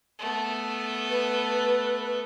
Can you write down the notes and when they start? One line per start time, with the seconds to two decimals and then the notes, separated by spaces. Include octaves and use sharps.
0.19 A3 B3
1.09 B4